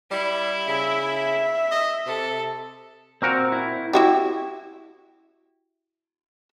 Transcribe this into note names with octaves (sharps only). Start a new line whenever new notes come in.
G3 E4
C#3 E5
D#5
C3 A4
A#2 C4 F#4 A#4
E4
E4 F#4 G4